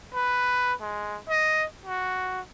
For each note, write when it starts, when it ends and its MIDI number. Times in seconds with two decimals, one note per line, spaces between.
0.14 0.74 71
0.81 1.18 56
1.29 1.66 75
1.86 2.41 66